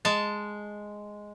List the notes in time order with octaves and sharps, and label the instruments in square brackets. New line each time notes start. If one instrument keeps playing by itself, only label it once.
[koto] G#3 A5